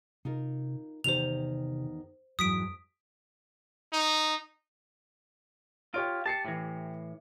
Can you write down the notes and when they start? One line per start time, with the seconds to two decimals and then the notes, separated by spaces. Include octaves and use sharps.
0.25 C3 D#4 F4 A#4
1.04 E2 C3 D#3 G4 C5 F7
2.39 F2 G#2 E3 F#3 D#6 B6 D7
3.93 D#4
5.94 F4 G4 C#5 D7
6.26 G4 A5 C7 C#7
6.45 A2 E3